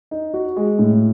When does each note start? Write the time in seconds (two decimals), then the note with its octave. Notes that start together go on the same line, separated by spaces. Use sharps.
0.11 D#4
0.34 F#4
0.56 G#3
0.79 A2